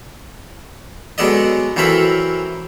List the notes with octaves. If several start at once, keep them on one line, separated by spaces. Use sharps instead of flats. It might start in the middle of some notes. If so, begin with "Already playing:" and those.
F#3 G#3 B3 A4 D5 D#5
E3 F#3 C4 A4 A#4 B5